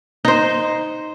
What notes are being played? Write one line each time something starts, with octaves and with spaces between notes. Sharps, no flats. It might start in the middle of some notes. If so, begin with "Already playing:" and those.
D#4 C5